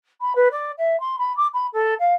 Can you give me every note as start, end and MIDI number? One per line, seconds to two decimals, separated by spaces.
0.21 0.33 83
0.35 0.48 71
0.51 0.72 74
0.78 0.99 76
1.00 1.16 84
1.18 1.35 83
1.37 1.47 86
1.54 1.67 83
1.73 1.94 69
1.99 2.14 77